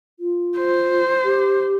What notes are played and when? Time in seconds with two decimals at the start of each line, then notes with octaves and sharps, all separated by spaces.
0.20 F4
0.57 C5
1.25 G4